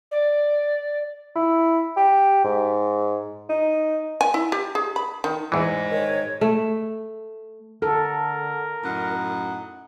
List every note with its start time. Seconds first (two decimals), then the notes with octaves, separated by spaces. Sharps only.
0.11 D5
1.36 E4
1.97 G4
2.45 G#2
3.50 D#4
4.21 G#5
4.34 E4
4.52 G4
4.75 G#4
4.96 B5
5.24 D#3
5.52 E2 G#2 E3 G#3
5.91 D#3 C#5
6.41 A3
7.82 D3 A4 A#4
8.83 F#2 A2 D#4 F#5